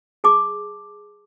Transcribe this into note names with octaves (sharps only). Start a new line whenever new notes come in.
G#4 A5 D6